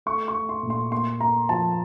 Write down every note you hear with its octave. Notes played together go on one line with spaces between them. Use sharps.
A3 C#6
C#6
A3
C6
A#2
C6
A#3 C6
A#3 A#5
F3 A5